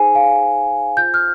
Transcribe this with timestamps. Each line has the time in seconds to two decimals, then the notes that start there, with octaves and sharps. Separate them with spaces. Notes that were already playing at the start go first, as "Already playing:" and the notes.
Already playing: D#4 G#4 C5 G#5
0.15 F5
0.42 D#4 G#4 C5
0.97 F4 C5 G6
1.14 F6